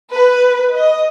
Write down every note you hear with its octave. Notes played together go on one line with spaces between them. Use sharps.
B4
D#5